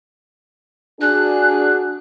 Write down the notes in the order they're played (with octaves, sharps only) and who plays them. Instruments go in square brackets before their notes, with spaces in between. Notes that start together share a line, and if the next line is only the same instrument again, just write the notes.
[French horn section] D4 F#4 G#4 [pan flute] F#6